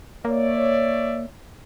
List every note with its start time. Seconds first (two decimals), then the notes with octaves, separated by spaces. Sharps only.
0.25 A#3 C#5 D5 E5